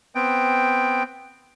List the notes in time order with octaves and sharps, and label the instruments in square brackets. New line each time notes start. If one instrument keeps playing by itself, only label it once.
[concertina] B3 C4 G5